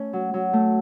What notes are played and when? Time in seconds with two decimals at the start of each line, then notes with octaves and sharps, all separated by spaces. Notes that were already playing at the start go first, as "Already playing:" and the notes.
Already playing: A3 C#4
0.13 F#3
0.34 F#3
0.53 A3